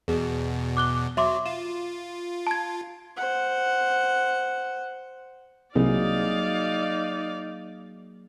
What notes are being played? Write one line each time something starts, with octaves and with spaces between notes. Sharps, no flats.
E2 B2 G#4
D6 F#6 G7
F#3 E5 C6 D6
F4 E7
A5 G#6
C5 F#5
C2 F#3 A#3 D#4 G#4 D5 F5